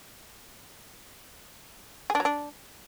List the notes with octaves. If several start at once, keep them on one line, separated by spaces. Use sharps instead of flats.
G#4
D4
F#3
D4